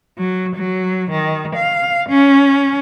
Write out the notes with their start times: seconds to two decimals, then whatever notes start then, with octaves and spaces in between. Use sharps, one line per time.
0.17 F#3
0.54 F#3
1.12 D#3
1.55 F5
2.09 C#4